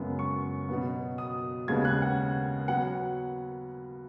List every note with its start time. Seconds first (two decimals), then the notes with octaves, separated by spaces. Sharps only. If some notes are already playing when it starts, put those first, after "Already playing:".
Already playing: F#2 C#3 G#3 B3
0.19 C#6
0.69 B2 F#3 B3
1.18 D#6
1.68 D#2 C#3 G#3 B3 G#6
1.85 F#6
2.02 F#5
2.68 F#3 B3 F#5